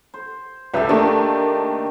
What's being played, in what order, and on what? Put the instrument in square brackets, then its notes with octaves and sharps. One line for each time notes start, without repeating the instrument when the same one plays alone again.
[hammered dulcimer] C5
[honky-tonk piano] C#2 B4 E5 [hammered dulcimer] G4 A4
[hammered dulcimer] D#3 [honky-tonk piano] A3 A#3 D4